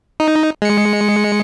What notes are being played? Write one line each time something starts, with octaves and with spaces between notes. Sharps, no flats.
D#4
G#3 C#7